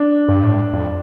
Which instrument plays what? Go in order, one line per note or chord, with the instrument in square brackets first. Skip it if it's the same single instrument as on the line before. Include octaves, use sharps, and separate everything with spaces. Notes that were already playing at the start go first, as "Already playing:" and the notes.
Already playing: [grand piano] D4
[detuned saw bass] G2
A2
G2
F2